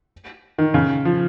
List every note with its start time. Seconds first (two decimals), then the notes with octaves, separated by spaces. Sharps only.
0.58 D#3
0.74 C#3
1.05 F3